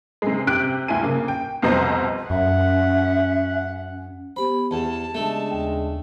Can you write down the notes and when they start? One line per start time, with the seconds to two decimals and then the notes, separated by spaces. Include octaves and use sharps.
0.22 C3 G#3
0.47 C3 G4 F#6 D7
0.88 D2 E4 G#5 D#7
1.03 C#3 A#3
1.28 G5
1.62 C2 F2 B2 C5 D#5 A#5
2.30 F#2 C#4 E5 F#5
4.36 B3 G4 C5 B5
4.71 E2 A5
5.15 C#3 G#3 A3 D4
5.51 D#2 G5